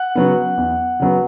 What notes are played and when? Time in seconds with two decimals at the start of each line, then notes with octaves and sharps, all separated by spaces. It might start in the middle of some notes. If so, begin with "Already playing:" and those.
Already playing: F#5 F#6
0.15 C#3 F#3 B3
0.57 E2
1.00 C#3 F#3 B3